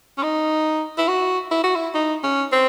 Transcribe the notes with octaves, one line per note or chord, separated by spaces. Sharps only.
C#4
D#4
E4
F#4
E4
F#4
E4
D#4
C#4
C4